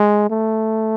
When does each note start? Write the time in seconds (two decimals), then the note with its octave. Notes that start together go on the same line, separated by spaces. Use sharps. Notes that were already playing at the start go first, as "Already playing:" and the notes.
Already playing: G#3
0.30 A3